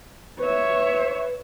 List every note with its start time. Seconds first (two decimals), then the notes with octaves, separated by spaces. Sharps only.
0.39 B4 C#5 E5